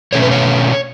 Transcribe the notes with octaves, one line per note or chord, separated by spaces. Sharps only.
B2 A3 C#4 C#5
B4
C#5